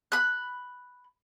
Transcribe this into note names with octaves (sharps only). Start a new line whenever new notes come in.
B5 F#6